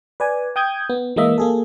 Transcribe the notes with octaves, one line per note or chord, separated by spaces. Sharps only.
B4 D5 G#5
G5 D#6 G6 G#6
B3
E3 G#3 A#3 D#5 E5
A#3 G#4 A4